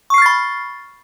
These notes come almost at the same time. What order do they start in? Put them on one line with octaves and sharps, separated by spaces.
C#6 C7 F6 A6 B5